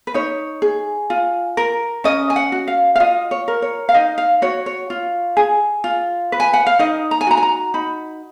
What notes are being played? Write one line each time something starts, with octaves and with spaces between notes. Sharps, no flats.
B4
D#4 C#5
G#4
F4
A#4
C#4 D#5
G#5
F#5
F#4
F5
F5
F4 D#5
C#5
A#4
C#5
F5
D#4 D#5
F5
F#4 C#5
C#5
F4
G#4
F4
B4
G#5
F#5
F5
D#4 D#5
A#5
G#5
F#4 A#5
G#5
A#5
D#4 B5